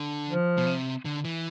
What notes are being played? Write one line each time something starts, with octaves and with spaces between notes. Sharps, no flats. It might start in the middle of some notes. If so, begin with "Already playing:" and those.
Already playing: D3
F3
B2
C3
D3
E3